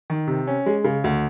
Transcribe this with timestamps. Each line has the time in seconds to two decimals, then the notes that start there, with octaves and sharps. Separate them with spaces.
0.10 D#3
0.27 C3
0.47 C#4
0.66 G#3
0.84 C#3
1.04 D2